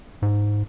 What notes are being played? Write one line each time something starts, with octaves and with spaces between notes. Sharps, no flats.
G#2